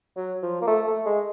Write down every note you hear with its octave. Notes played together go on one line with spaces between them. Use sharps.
F#3
F3
A#3
A3
A3
G#3